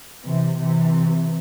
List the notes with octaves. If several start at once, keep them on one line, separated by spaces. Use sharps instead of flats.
C3 E3
C3 E3